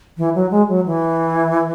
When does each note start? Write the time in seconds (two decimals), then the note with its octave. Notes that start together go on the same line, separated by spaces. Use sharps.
0.18 E3
0.35 F#3
0.51 G#3
0.68 F#3
0.86 E3